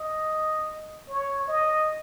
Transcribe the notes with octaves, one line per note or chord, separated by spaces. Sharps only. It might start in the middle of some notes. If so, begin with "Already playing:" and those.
Already playing: D#5
C#5
D#5